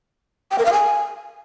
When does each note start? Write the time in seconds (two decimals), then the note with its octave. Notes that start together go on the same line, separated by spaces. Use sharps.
0.51 G5
0.58 A#4
0.65 F5
0.72 G#5